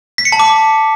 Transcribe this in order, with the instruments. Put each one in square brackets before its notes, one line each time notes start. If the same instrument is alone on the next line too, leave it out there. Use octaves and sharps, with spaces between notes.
[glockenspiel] B6
C#7
A5
D6